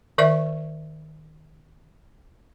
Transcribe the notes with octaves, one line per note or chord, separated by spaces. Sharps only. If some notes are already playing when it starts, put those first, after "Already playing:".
D#3 A#4 D5 E5 C#6